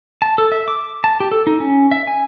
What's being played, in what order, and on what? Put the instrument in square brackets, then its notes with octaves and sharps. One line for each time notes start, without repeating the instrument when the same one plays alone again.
[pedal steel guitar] A5
A4
E5
D6
A5
G4
A4
D#4
C#4
E5
G#5